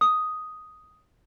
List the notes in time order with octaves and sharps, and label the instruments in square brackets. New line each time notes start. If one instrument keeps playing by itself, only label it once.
[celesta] D#6